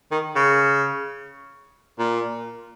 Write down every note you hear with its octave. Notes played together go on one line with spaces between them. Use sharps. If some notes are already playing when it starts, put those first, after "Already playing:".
D#3
C#3
A#2